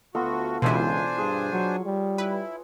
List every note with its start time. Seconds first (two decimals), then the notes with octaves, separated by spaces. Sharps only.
0.15 D2 B3 F4 F#4 A4
0.62 C#2 B2 E3 D4 E4 C5 G#5 C6
1.18 G2 G#4
1.52 F#3 C#5
1.85 G3
2.18 E4 B4